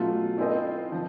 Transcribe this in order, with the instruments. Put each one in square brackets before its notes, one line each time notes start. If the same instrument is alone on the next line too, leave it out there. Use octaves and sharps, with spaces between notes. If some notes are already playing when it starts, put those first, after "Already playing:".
Already playing: [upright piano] B2 F#3 A3 C#4 [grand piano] F4
[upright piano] C4 E4 A4 C5 D#5
F3